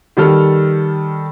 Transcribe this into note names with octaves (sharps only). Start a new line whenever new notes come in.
D#3 G3 A4 F6